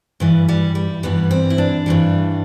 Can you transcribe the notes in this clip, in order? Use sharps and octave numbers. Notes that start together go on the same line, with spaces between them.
G2 E3 G3
G3
G3
G2 E3 G3 B3
C4
E4
D4
G2 E3 G3